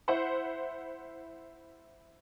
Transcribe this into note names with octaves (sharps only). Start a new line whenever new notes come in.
E4 C5 F#5 C6